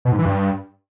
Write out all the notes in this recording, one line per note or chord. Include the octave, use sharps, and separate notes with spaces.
B2
G#2
E3
G2